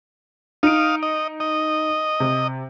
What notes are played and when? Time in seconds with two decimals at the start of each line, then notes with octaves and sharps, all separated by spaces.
0.63 D#4 F5 D#6 D7
1.03 D#5
1.40 D#5
2.20 C3